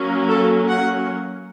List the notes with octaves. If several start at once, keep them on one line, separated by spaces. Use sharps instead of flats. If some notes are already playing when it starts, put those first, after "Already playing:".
Already playing: F#3 A#3 C#4
A4
F#5